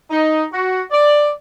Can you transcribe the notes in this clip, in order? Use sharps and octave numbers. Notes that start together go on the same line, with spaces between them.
D#4
F#4
D5